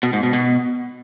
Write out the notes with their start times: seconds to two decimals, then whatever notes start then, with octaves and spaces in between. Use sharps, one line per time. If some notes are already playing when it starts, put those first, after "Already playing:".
0.03 B2
0.13 G#2
0.23 B2
0.33 B2